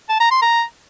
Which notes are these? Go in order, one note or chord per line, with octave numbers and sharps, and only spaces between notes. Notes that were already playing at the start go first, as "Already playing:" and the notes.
A5
A#5
C6
A#5